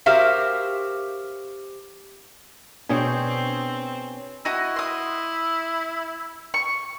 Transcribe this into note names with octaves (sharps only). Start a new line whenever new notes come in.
F#4 G4 A#4 C5 E5 F5
B2 C4 D4 G#4 C#5 G5 G#5
E4 F#4 D#5
C6 D#6
C#6